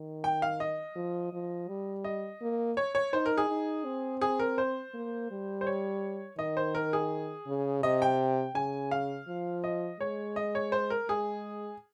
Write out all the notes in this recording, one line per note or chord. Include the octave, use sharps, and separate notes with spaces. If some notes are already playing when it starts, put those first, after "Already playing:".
Already playing: D#3
G5
F5
D#5
F3
F3
G3
D#5
A#3
C#5
C#5
D#4 C5
A#4
G#4
D#4
C4
G#4
A#4
C5
A#3
G3
C5
C#5
D#3 D#5
C5
A#4
G#4
C#3
C3 D#5
G5
C#3 G#5
F5
F3
D#5
G#3 C#5
D#5
C#5
C5
A#4
G#3 G#4